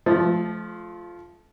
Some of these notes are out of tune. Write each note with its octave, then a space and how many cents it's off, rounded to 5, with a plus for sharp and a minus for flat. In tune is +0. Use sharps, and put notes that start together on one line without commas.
F3 +0 A3 -30